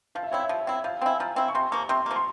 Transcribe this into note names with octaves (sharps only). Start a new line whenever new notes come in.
F3 F5
E5
C4 E4 C#5
E5
F3
C4 E4
F3 F5
C4 E4 G#5
F3 A#5
C4 E4
C#6
C3 C6
F3 A#3 C#6
C3 C6
F3 A#3
C6